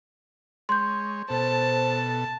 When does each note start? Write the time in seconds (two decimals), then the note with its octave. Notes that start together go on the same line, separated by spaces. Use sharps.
0.69 G#3 C#5 C6 G6
1.30 B2 A4 C5 A5